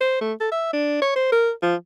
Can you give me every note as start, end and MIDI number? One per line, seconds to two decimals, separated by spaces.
0.01 0.20 72
0.21 0.33 57
0.40 0.51 69
0.52 0.71 76
0.73 1.00 62
1.02 1.11 73
1.16 1.28 72
1.32 1.51 70
1.62 1.75 53